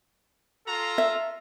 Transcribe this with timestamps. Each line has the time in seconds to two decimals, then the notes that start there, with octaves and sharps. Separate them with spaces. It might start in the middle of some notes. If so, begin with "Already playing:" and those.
0.67 F4 A4 A#5
0.98 E5